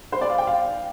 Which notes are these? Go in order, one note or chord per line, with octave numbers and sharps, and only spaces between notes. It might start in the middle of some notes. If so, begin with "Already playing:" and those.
C5
D5
F5
G5
F5